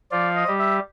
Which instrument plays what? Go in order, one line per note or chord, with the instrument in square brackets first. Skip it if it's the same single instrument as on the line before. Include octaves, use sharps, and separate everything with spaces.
[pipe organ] F3 F4 [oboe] D5
[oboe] D#5
[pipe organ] G3 G4
[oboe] E5